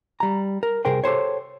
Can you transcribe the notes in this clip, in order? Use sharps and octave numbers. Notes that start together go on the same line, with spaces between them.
G3 A#5
A#4
C2 C3 G#4 A#4 C5 G5
G4 A4 C5 C#5